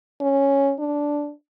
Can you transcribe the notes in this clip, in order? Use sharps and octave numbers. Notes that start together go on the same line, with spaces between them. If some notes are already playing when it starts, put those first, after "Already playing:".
C#4
D4